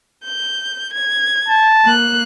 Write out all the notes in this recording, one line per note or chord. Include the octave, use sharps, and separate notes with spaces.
G6
G#6
A5
A#3 F#6